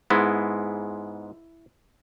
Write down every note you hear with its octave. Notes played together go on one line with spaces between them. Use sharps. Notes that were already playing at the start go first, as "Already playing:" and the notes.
G#2 G#3 B3 E4